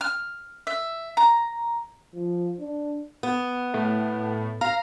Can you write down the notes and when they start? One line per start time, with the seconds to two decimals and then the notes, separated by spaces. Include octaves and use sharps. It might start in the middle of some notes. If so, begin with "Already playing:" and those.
0.01 F6
0.67 E5
1.17 A#5
2.15 F3
2.60 D4
3.23 B3
3.74 A2
4.61 F5 A#5